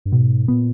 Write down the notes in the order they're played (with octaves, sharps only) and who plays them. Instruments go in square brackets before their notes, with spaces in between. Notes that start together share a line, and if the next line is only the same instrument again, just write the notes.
[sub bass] G2
[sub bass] G#2 [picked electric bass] B2
[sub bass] A#2 [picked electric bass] B3